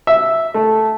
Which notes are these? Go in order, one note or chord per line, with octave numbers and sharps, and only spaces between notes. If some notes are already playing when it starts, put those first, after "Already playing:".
E5
A3